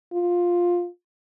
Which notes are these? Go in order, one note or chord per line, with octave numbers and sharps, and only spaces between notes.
F4